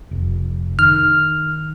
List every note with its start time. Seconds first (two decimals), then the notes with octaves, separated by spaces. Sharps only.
0.11 F1
0.79 D#3 F6